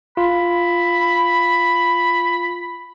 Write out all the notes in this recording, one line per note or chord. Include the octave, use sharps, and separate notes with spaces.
F4 B5